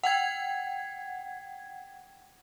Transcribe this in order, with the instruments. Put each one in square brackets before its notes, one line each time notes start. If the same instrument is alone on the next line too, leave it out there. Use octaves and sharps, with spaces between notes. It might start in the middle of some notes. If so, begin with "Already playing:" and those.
[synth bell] F#5 G5 G#6